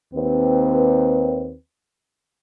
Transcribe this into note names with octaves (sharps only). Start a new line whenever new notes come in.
D#2 C4 B4